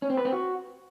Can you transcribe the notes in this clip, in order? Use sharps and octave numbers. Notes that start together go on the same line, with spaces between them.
C#4
C4
B4
C4
F#4